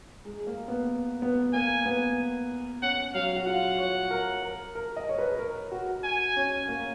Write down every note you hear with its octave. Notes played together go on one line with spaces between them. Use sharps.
G#3
A#3
B3
B3
A#3 G#5
B3
C#4 F#5
F#3 F5
F#4
F4 F#5
C#5
A#4
A#4
A#4
D#5
C#5
B4
A#4
F#4
G#5
C#4
A#3